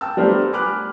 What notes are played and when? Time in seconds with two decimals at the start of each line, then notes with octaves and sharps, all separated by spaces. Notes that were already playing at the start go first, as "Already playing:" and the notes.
0.01 G5 A5 E6
0.17 G3 A3 B3 D4 A#4 C5
0.53 G#5 B5 D6 F6 F#6